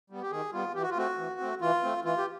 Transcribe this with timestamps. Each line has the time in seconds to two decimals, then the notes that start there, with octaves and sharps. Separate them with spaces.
0.10 G3 B3
0.22 G4
0.31 D#3 G#4
0.53 G3 B3 F4
0.75 E3 G4
0.82 F#4
0.90 F4
0.97 A3 C4 F#4
1.18 E3
1.40 A3 C4
1.61 E3 F4
1.83 A3 C4
2.05 E3 F4
2.17 G4